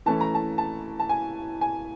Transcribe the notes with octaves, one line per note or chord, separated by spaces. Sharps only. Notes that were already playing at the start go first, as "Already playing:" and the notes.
E3 A3 C#4 A5
A#5
A5
A5
A5
G#5
G#5